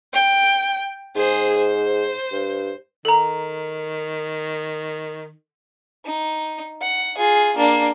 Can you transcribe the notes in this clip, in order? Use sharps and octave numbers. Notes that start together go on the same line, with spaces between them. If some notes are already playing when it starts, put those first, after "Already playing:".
G5
G#2 G#4 C5
C5
G2
D#3 A4 A#5
D#4
F#5
F4 G#4
A#3 D4